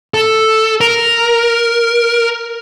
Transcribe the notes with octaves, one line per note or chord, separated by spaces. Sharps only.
A4
A#4